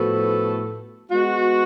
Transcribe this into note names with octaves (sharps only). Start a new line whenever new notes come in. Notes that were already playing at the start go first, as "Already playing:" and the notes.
Already playing: A2 F3 B3 F#4 A4
G#3 B3 F#4